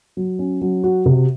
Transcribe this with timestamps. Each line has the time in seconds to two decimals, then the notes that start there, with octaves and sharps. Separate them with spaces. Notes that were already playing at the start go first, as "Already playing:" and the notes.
0.17 F#3
0.39 C#4
0.61 F#3
0.83 F#4
1.06 C3